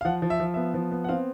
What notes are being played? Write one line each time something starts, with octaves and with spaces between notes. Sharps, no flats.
F5
F3 F#5
F3
E5
F3
B3 E5
F3
B3
F#5
C4 F5